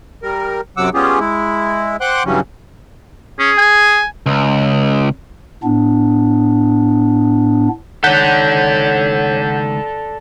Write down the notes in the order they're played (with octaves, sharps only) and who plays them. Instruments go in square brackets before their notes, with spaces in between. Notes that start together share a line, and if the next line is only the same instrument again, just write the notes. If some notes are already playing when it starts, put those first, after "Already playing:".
[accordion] G3 A#4
F#2 C3 F#3 F#5 D6 E6
G3 B3 C#4 F4 G4 G#4
G#3 E4
C5 F#5 G5 C6 D6 F#6
G2 C#3 E3 F#3 G3 C#4
[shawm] C#4 [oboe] G#4
[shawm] G#5
[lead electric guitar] C#2
[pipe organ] A2 B3 D4
[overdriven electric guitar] C#2 D#3 [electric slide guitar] A4 D5 [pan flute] C#5 [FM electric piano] F#5 G6 B6